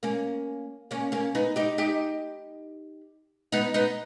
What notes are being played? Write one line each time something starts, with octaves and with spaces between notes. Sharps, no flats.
A#3 C#4
A#3 C#4
A#3 C#4
B3 D#4
D#4 G4
D#4 G4
B3 D#4
B3 D#4